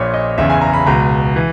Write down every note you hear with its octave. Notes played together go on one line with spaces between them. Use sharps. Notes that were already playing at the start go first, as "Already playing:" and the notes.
Already playing: A#1 A#2 C#5
D#5
F#1 E2 C#3 E5
G#5
A#5
B5
C#2 B2 A#5
E3